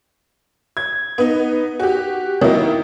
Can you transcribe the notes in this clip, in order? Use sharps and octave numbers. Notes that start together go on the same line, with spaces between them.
G#6
B3 D#4
F#4 G4
D#3 F#3 A#3 B3 D#4 E4